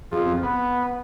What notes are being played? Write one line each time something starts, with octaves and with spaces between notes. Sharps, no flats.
F2 G#4
C4
B3 F#5